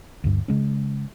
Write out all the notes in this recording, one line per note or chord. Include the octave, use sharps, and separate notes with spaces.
D2 G2
C#3 G#3 C#4